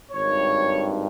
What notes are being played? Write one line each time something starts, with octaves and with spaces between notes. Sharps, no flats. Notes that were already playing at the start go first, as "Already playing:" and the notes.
G#1 G2 D#3 C#5